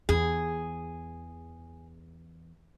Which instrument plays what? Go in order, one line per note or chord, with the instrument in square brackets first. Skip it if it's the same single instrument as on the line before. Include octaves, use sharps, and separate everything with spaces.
[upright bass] E2 [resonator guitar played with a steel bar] G#4